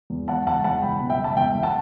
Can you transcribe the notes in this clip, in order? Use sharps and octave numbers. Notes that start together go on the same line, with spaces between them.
E2
E2 F#5 A5
F#1 F#5 A5
E2 F#5 A5
F#1 G5 B5
B2
E5 G5
F#1
A5
E2 E5 G5
F#1
F#5 A5